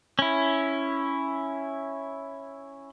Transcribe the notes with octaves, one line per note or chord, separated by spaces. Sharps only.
C#4 E4